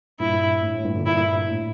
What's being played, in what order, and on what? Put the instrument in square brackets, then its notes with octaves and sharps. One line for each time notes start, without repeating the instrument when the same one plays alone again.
[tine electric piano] G2 A#2 [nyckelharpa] E4
[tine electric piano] A2
A2
G2 A#2
A#2 D3
[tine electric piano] G2 A#2 [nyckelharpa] E4
[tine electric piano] A2